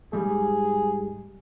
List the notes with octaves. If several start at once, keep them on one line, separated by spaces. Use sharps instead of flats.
G#2 G3 G#4